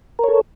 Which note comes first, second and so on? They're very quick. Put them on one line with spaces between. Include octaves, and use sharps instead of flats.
A#4 C#5 A4